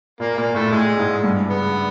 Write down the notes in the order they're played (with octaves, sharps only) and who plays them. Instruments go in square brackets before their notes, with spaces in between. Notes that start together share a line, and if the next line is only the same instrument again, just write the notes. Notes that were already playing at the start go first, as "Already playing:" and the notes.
[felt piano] A#2 [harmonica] A#3
[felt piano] A#2 [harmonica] A#3
[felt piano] A2 [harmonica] A3
[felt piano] A2 [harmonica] G#3
[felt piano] G#2
G2
[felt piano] C#3 [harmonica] B3